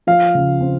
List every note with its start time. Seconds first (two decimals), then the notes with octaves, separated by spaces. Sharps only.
0.07 F3 F5
0.35 C#3
0.61 C4